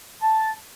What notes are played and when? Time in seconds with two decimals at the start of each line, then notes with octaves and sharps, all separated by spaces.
0.21 A5